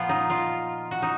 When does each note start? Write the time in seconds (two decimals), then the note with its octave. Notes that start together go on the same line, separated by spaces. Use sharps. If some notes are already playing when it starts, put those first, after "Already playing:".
Already playing: A#2 F3 B3 F4
0.09 D#4
0.30 F4
0.91 F#4
1.02 D#4